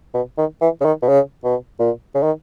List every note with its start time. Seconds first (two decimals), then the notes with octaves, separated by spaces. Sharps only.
0.14 B2
0.38 D#3
0.62 E3
0.81 C#3
0.85 D#3
1.02 B2
1.09 C#3
1.44 B2
1.79 A#2
2.15 C#3
2.23 D#3